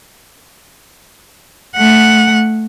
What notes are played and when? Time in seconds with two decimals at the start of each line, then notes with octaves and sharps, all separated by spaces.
1.76 A3 F#5